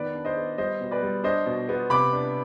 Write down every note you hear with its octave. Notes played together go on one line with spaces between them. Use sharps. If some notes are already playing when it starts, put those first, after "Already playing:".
Already playing: D#3 B3 B4 D5
D4
C5 D#5
B3
G3 C5 D#5
B2
B4 D5
G3
D4 C5 D#5
B2
B3
C3 B5 D6
D4